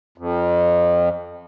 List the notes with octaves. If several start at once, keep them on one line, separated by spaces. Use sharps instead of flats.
F2